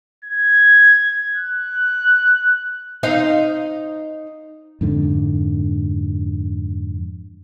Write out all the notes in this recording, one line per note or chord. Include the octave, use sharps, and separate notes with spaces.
G#6
F#6
D#4 C5 F5
F2 G#2 D3